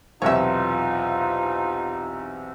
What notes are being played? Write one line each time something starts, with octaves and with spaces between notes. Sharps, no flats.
B1 E2 C3 D#4 F4 C#5 E5